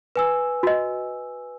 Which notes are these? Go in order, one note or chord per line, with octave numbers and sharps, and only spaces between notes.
B4 G#5 E6
F#4 D#5